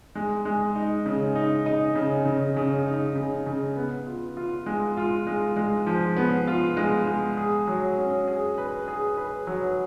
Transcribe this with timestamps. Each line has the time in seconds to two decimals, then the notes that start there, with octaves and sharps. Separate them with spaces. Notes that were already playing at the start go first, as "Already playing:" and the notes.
0.15 G#3
0.45 G#3
0.75 D#4
1.06 C#3
1.35 D#4
1.66 D#4
1.95 C#3
2.25 C#3
2.56 C#3
2.86 D#4
3.15 C#3
3.46 C#3
3.76 B3
4.06 F4
4.37 F4
4.66 G#3
4.97 F4
5.27 G#3
5.56 G#3
5.87 F3
6.17 B3
6.47 F4
6.77 G#3
7.07 G#3
7.37 G#4
7.67 F#3
7.98 C#4
8.28 G#4
8.58 B4
8.88 G#4
9.17 B4
9.47 F#3